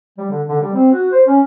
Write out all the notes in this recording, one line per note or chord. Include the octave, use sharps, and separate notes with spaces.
G3
D3
D3
G3
C4
F#4
C5
C#4